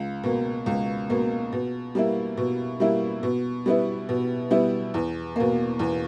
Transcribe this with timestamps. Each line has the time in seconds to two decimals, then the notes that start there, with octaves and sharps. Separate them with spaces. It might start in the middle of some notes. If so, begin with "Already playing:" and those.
Already playing: C#2
0.23 B2 A#3
0.66 C#2
1.10 B2 A#3
1.52 B2
1.95 G3 A#3 E4
2.37 B2
2.80 G3 A#3 E4
3.23 B2
3.66 G3 B3 E4
4.09 B2
4.51 G3 B3 E4
4.94 E2
5.36 B2 A#3
5.79 E2